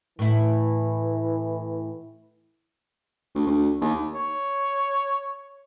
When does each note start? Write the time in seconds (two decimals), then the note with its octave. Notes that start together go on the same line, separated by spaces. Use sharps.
0.19 A2 E3 E4
3.35 D2
3.47 D2
3.81 D#2
4.14 C#5